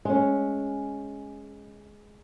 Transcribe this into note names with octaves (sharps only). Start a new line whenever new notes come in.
G#3 C#4